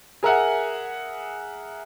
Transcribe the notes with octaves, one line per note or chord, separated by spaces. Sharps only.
G#4 A#4 E5 F#5 G#5